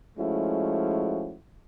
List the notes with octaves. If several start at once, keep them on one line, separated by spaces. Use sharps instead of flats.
F3 G#3 A3 C#4 E4 F#4